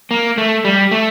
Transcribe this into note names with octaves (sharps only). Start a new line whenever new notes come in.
A#3
A3
G3
A3